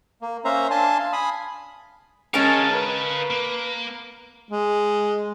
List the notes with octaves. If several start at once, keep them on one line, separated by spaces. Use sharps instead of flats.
A#3
A#3 C#4 C5 E5 F5 A#5
D4 F5 G#5 A5 C6
F5
G#5 B5 D#6
G#3 C#4 A#4 C#5 F5 A5
B4
A#3
G#3